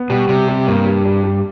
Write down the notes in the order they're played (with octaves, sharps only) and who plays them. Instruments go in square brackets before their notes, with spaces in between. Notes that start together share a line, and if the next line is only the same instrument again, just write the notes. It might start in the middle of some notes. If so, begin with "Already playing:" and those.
Already playing: [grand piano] B3
[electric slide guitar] B2 [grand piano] G3
[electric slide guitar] C3 [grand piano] G3
[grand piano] G3
[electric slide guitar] G2 [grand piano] A#3
[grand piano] G3
G3
G3